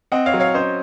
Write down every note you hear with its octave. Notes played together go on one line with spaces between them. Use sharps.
C4 D#5 F#5
C#5 F5
F#3
C#5 F5
C#4 C5 D#5